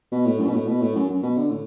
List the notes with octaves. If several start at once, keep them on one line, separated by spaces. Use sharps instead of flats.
B2
A2
F#2
B2
A2
B2
A2
F#2
F#2
B2
D3
A2